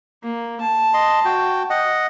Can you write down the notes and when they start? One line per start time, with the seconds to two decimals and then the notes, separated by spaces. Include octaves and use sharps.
0.23 A#3
0.61 A5
0.94 D#5 C6
1.25 F#4 G5
1.70 D#5 F#5